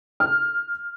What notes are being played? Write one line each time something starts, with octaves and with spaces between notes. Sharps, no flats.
F6